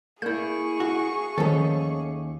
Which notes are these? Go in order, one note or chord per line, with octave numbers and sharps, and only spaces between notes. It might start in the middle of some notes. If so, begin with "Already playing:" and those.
A#3 E4 G#4 C#6 G6
F#4
D#2 D#3 F3 A3 C#4 A4